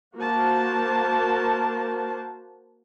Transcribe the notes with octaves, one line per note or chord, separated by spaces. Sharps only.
A#3 F#4 A#4 C5 A5